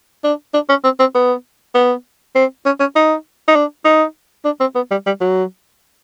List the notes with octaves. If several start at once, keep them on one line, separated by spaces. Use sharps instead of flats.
D4
D4
C#4
C4
C4
B3
B3
C4
C#4
C#4
D#4
D#4
D4
D#4
D4
C4
B3
G3
G3
F#3